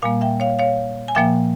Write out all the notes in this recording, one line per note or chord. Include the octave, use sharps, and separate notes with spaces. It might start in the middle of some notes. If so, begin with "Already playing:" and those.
A#2 G3 A#3 F5 G#5
E5 G5
C#5 F5
C#5 F5
G#5
A#2 F3 A#3 E5 G5